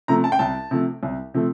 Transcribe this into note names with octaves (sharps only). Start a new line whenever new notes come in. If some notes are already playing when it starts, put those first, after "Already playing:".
C3 F3 A3 A#5
A5
G5
C2 A5
C3 F3 A3
C2
C3 F3 A3